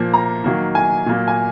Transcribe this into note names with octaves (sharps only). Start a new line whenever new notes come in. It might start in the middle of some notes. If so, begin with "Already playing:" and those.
Already playing: A#2 F3 A#3
A#5
D#3 F#3 A#3
G#5
A#2 F#3 A#3
G#5